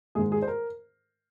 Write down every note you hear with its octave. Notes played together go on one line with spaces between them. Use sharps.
G#2 D#3 G#3 G#4
G#4
C5
A#4